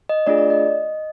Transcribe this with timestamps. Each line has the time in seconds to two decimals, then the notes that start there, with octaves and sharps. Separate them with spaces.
0.09 D#5
0.27 A3 D4 F4 G#4 D5
0.38 D5
0.50 D#5